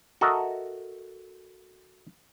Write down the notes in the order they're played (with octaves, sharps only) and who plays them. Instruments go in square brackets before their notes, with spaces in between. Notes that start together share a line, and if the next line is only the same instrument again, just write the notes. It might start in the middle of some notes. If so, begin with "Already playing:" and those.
[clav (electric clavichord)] F#4 A4 A#4 D#5 E5